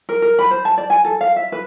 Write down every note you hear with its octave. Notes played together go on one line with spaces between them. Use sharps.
A#4
A#4
B5
C5
A5
D5
G#5
A4
F5
E5
B4